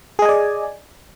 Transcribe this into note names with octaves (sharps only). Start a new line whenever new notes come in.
G#4 D5 D#5 G#5